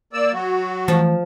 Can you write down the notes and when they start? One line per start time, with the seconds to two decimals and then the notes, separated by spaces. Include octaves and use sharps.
0.13 A#3 D5 E6
0.33 F#3 F#4
0.88 E3 F3 A3